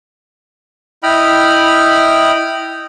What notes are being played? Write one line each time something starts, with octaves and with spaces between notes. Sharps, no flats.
E4 D#5 G5 B5 F6